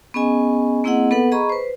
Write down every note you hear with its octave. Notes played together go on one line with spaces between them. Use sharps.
B3 C#4 G#4 D#5 G#5
A#3 C4 E4 G#4 D#5 F#5
B3 A4 B4 F#5
G#4 D#5 A#5 B5 C#6
B4 C5